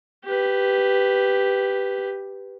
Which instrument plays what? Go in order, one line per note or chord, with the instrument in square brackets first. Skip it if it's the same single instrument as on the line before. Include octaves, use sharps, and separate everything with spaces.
[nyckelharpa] G4 B4